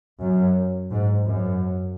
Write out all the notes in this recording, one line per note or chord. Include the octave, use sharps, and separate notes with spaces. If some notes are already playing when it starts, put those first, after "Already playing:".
F#2
G#2
F#2